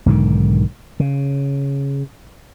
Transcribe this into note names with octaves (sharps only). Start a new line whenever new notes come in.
B1 G#2 D3 D#3
C#3